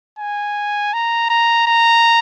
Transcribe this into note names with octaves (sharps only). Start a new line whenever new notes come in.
G#5
A#5
A#5
A#5